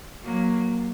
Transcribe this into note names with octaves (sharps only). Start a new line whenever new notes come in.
F#3 A#3